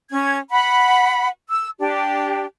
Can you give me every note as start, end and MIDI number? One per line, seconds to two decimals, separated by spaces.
0.11 0.37 61
0.11 0.37 92
0.50 1.29 78
0.50 1.29 83
1.50 1.70 88
1.79 2.45 62
1.79 2.45 67